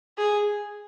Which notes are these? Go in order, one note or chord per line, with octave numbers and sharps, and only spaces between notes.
G#4